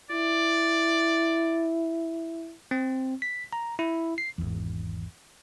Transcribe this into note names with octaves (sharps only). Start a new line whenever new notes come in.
E4 D5
C4
B6
A#5
E4
C7
G#1 E2